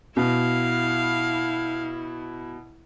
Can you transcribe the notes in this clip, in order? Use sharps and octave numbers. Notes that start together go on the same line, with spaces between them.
B2 E4 F5